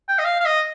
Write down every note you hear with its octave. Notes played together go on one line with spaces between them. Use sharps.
G5
D#5
F5
F5
D#5